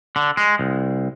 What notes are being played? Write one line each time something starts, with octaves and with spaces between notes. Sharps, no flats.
D3
G#3
C2